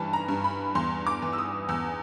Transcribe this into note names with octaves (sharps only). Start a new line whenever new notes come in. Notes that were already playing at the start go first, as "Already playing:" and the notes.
Already playing: G2 E3 A5 B5
A#5
G2
B5
E2 C6
D6
E3
E6
D#6
E2 E6